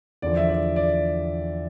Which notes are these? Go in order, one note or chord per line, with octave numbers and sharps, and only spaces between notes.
E2 D3 F3 D5
E5
D5
D5